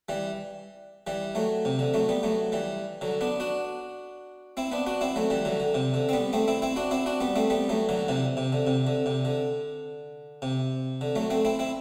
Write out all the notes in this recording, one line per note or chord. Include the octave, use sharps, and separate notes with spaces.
E3 G3
E3 G3
F#3 A3
C3
D3
F#3 A3
G3 B3
F#3 A3
E3 G3
D3 F#3
B3 D4
D4 F#4
C4 E4
B3 D4
D4 F#4
C4 E4
F#3 A3
E3 G3
D3 F#3
D3
C3
D3
C4
G3 B3
A3 C4
C4 E4
C4 E4
D4 F#4
C4 E4
D4 F#4
G3 B3
A3 C4
G3 B3
F#3 A3
D3 F#3
C3 E3
C3
D3
C3
D3
C3
D3
C3
D3
F#3 A3
A3 C4
C4 E4
C4 E4